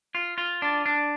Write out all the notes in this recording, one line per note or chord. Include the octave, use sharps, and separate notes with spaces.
F4
F4
D4
D4